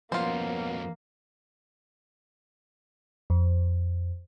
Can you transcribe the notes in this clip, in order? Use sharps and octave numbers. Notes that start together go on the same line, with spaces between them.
F2 B2 A#3 C#4 F4 C5
F2